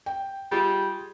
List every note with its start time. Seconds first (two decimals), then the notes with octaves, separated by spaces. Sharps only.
0.06 G5
0.52 G3 F4 G#4